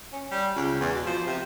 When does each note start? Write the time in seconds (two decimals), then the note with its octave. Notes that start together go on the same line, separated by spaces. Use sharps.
0.13 C#4
0.31 G3
0.56 C#2
0.80 E2
0.95 B2
1.07 F3
1.27 C3